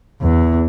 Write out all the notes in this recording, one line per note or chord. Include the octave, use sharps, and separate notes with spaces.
E2